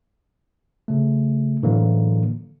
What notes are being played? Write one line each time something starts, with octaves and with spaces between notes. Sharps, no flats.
C#3 A3
A2 D3 E3 F#3 A#3